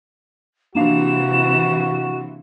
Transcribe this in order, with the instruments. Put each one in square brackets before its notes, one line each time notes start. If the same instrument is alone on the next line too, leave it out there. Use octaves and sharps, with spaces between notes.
[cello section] C3 E3 [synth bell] A#3 D4 F5 [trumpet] F#4 [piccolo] E7